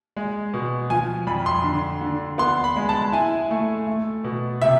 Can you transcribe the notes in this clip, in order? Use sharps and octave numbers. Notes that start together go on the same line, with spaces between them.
G#3
B2
F3 G#5
F2 B5
C6
D3
D3
B3 C6
B5
G#3
A5
E4 G#5
A3
A3
B2
C3 E5